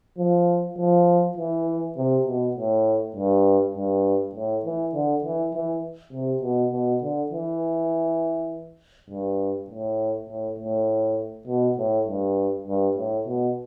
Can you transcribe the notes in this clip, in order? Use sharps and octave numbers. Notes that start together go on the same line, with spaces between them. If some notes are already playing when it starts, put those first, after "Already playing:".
F3
F3
E3
C3
B2
A2
G2
G2
A2
E3
D3
E3
E3
C3
B2
B2
D3
E3
G2
A2
A2
A2
B2
A2
G2
G2
A2
B2